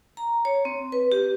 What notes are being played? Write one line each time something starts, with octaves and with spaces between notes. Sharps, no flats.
A#5
C#5
C4
B4
G4